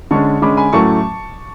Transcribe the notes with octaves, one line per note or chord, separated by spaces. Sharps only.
D3 G#3 C#4 A5 C#6
D3 G#3 C#4 B5 D6
G#5 B5
A2 F#3 A3 C#4 A5 C#6